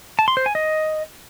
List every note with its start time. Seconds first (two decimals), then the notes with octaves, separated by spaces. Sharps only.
0.19 A5
0.28 C6
0.37 C5
0.46 G#5
0.55 D#5